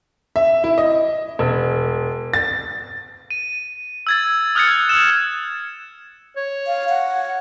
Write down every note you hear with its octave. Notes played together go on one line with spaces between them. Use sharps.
E5
E4
D#5
E1
A6
D#7
E6 G#6 A6
D#6 F6 F#6 G#6 A6 C#7
E6 F6 E7
C#5
F5
F#5